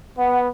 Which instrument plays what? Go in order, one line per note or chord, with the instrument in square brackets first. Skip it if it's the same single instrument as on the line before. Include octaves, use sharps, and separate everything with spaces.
[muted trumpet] B3 [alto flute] F#5